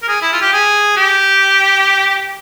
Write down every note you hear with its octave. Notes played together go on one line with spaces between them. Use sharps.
A#4
G#4
E4
F4
G4
G#4
G4